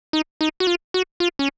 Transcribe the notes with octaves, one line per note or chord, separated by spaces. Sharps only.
D#4
D#4
F#4
F4
F#4
F4
C#4